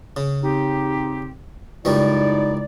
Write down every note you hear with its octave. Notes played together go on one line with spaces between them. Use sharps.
C#3
C4 D#4 G4
C#2 F#2 G3 D#4 E4 D5